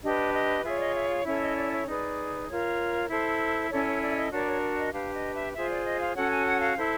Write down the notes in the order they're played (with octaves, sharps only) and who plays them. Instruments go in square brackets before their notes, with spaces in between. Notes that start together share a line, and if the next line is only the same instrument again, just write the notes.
[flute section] D4 G4 B4 D#5
D#5
F4 G#4 C#5 E5
D5
D#5
E5
F5
C#4 E4 A4 C#5 E5
D#5
D5
C#5
D#4 G#4 B4 D5
F4 A#4 C#5
E4 A4 C5
C#4 E4 A4 C#5 D5
C#5
D5
E5
D#5
D4 F#4 A#4 C#5 D5
C#5
D5
D#5
D4 G4 B4 F5
D#5
E5
F4 G#4 C5 E5
D5
D#5
F5
C#4 F#4 A4 C#5 F#5
G#5
F#5
F5
E4 A4 C5